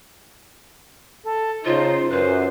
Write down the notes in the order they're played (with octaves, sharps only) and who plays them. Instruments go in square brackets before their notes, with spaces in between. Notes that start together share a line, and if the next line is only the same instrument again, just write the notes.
[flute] A4
[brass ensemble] C#3 D#4 [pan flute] F4 [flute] C5
[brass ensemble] F#2 [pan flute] B4 [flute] C5